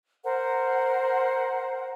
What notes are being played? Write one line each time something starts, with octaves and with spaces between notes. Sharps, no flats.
A#4 C5 F#5